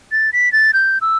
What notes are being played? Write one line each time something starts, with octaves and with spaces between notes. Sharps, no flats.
A6
B6
A6
G6
E6